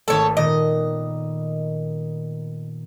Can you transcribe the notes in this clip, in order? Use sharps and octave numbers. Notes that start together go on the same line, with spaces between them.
G#1 A3 A4 C#5
A#2 D#3 B3 D#5